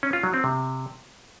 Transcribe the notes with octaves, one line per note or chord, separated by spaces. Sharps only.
C#4
F4
F#3
C4
C3